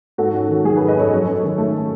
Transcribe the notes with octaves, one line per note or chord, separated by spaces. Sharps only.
G#2 F#4 A4
C#4
D#3
F#3 G#4
G#4 B4
G#2
B4 D#5
C#4 A4 C#5
F#2
C#4
D#3
A3